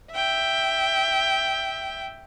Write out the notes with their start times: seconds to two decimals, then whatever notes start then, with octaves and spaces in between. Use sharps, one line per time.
0.13 E5 G5